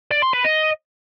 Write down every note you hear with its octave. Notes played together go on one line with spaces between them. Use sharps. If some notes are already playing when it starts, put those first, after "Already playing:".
D5
C6
B4
D#5